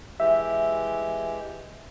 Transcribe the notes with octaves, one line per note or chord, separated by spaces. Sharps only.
E3 G#3 G4 E5